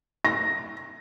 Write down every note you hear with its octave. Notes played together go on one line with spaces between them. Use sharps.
A#6